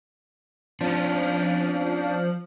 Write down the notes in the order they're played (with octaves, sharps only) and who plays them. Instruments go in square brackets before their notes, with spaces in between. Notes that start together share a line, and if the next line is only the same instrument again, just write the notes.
[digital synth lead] F3 [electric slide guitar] C#4 D4